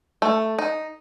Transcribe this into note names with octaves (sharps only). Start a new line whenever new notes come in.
A3
D#4